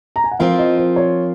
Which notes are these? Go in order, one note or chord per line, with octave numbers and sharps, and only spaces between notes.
A#5
G#5
F#5
F3 C4 F4 A#4 F5
D#5
C5
C#5